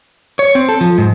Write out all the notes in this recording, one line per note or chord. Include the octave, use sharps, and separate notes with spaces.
C#5
C4
A4
F3
G#2